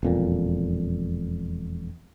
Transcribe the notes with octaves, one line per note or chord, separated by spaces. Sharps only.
E1 F2 A#2